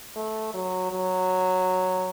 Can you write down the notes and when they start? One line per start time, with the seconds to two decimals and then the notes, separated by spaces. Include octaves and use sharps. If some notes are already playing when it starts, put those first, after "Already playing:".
0.16 A3
0.54 F#3
0.91 F#3